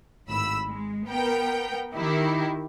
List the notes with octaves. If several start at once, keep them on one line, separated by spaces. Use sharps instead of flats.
G#1 A2 B5 E6
G#3
B3 A#4 G5
D#3 E4 G4